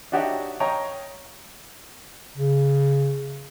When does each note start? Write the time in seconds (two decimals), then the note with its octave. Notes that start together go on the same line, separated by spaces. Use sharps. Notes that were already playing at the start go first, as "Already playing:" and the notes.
0.12 D4 D#4 F#4 G4 C#5 E5
0.60 C#5 D#5 F5 G5 A#5 C#6
2.37 C#3